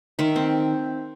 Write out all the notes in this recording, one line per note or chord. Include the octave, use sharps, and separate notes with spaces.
D#3 E5
C4